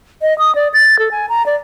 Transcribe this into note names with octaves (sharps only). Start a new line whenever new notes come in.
D#5
D#6
D5
A6
A4
G#5
A#5
D5